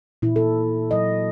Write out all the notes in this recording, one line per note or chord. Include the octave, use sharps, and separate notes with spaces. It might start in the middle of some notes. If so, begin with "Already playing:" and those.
A#2 E3 E4
A4
F#3 D#5